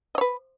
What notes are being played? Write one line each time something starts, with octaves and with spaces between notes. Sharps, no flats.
B4 C#5 D#5